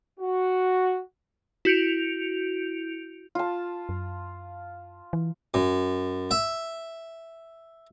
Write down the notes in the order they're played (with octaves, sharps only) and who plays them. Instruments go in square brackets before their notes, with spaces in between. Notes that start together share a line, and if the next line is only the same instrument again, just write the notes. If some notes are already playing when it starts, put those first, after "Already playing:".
[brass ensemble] F#4
[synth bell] E4 F#4 G6 C#7 D7 F7
[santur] F4 A5
[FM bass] F#2
E3
[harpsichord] F#2
E5